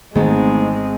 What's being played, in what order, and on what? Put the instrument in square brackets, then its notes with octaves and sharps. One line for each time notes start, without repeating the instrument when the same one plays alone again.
[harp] G#1 [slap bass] E3 A3 B3 [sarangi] G#3 [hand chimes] D#4 D#5 A#5